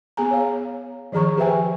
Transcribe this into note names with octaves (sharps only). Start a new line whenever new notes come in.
B3 G#4 G#5 A#5
C#5 F5
D#3 F3 G#4 A#5 C#6
G4 B4 C5 E5 G5 G#5